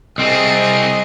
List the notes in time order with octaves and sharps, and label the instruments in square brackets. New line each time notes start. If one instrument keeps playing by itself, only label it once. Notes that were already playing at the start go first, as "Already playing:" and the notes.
[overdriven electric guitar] C2 C4 [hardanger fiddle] G#4 D#5